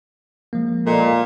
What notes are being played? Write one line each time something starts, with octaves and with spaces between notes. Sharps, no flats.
F3 G#3 A#3
A#2 A4 D#5 F5